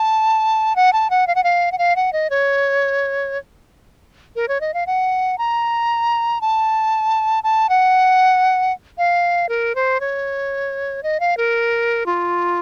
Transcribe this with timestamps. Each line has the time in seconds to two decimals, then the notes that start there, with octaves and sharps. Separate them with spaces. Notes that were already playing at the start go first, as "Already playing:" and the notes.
Already playing: A5
0.76 F#5
0.93 A5
1.10 F#5
1.27 F5
1.35 F#5
1.44 F5
1.72 F#5
1.79 F5
1.96 F#5
2.13 D#5
2.30 C#5
4.36 A#4
4.48 C#5
4.61 D#5
4.74 F5
4.87 F#5
5.38 A#5
6.41 A5
7.44 A5
7.69 F#5
8.98 F5
9.49 A#4
9.75 C5
10.00 C#5
11.03 D#5
11.20 F5
11.37 A#4
12.06 F4